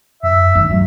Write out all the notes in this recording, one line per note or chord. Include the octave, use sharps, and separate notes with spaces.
F#2 E5
G2 D#3
F#3